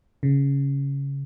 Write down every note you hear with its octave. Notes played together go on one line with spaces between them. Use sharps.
C#3